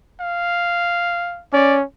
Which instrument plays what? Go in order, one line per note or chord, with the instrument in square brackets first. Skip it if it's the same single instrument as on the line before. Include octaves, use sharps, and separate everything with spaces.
[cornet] F5
[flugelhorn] C#4 [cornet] D5